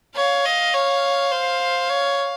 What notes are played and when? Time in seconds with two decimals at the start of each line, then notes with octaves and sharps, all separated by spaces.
0.15 C#5 F5
0.45 D#5
0.73 C#5
1.32 C5
1.89 C#5